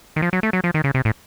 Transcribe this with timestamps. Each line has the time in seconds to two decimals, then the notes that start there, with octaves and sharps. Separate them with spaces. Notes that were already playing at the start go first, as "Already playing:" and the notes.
0.16 D#3
0.22 F3
0.33 F#3
0.43 A3
0.53 F#3
0.64 F3
0.74 D#3
0.84 C#3
0.94 C3
1.05 A2